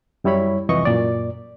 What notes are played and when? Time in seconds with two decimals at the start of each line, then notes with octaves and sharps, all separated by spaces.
0.24 F#2 G3 E4 C#5 B5
0.69 C2 F2 E3 D#5 C#6
0.85 F#2 A#2 D5